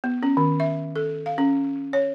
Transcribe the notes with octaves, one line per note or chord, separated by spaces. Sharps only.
B3
C#4
D#3
E5
A4
F5
C#4
C#5